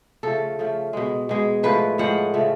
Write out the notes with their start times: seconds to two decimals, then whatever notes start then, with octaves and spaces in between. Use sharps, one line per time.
0.23 C#3 F3 A3 A4
0.59 C#3 F3 A3
0.93 B2 G#3
1.29 B2 G#3
1.63 A2 F3 G#3 B4
1.98 A2 F3 G#3 F#5
2.34 C#3 F3 A3